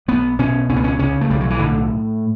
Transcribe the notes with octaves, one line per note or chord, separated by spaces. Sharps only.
B1 B3
B2 C#4
C#2 C#4
B3
C#4
C#3 C#4
A3
B1 G3
F#3
E3
A2 D3